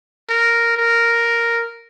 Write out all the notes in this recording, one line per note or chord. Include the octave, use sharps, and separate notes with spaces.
A#4
A#4